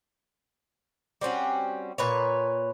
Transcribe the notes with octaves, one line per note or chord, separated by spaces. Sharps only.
G3 C4 C#4 F#4
A#2 B4 C#5